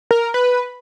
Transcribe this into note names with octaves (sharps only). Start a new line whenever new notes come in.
A#4
B4